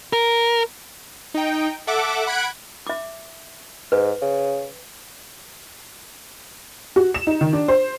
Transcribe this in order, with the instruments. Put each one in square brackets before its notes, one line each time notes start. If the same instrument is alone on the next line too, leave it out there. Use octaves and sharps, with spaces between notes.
[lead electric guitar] A#4
[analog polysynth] D#4 G5
A4 E5 F#5 D6
F#5 B5 F#6 G#6 D7
[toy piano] E5 D6
[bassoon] G#2 [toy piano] B4
[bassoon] C#3
[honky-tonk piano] F#4
E7
D#4
D#3
D4
C5